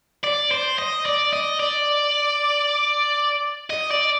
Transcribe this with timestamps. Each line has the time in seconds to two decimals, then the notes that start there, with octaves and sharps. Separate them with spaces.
0.24 D5
0.51 C5
0.78 D#5
1.05 D5
1.33 D#5
1.60 D5
3.70 D#5
3.91 D5